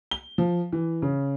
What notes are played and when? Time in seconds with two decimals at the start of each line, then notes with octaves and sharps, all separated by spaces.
0.11 G7
0.38 F3
0.73 E3
1.02 C#3